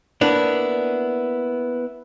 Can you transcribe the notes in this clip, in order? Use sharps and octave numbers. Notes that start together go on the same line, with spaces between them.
A#3 B3 D4 E4